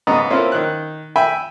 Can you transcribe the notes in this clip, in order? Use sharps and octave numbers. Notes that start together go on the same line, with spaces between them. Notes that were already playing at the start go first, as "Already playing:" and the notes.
G#2 C#3 B3 D#5 A#5 D#6
A#3 C4 C#4 E4 F4
D#3 F#6
E5 G5 G#5 B5